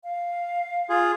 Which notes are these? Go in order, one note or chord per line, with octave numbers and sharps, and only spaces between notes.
F5
F4 G#4